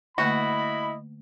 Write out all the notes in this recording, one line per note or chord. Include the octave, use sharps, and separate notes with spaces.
D3 A3 A#3 E4 F#4 D#5 B5